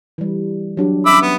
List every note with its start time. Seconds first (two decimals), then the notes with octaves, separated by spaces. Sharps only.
0.18 E3 G3
0.77 F#3 D4 G4
1.06 C#4 E5 B5 D6 E6
1.22 B3